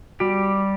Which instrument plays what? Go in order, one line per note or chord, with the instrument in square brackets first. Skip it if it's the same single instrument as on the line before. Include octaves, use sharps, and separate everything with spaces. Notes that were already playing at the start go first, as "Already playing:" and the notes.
[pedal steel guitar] G3 G4 [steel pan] F#4